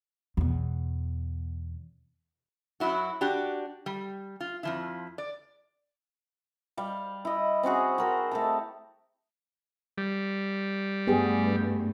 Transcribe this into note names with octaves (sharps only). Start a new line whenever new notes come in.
E2 B2
F#2 F#3 E4 F#4
D4 F#4 G4
G3
F4
F2 F3 E4
D5
G3 F5
E4 D#5
C4 C#4 F#4 G#4
F#4 A#4 C5
A3 G4 A4
G3
G2 A3 B3 G4 G#4